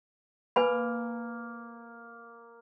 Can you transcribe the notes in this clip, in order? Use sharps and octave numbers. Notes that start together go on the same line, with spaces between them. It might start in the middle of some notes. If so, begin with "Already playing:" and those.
A#3 B4 G#5 B5